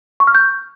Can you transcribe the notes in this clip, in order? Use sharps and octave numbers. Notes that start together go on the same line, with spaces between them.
C#6
F6
G6